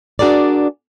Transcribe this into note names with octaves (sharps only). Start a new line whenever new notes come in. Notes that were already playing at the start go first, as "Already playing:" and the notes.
D4 F#4 G#4 A#4 D5